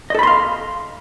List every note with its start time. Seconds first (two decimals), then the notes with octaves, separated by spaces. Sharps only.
0.10 D#5
0.15 A4
0.19 B5
0.23 C6
0.27 F5